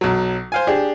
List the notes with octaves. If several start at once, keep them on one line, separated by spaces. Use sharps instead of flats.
B1 F#3
C5 F5 G#5
D4 G4 G#4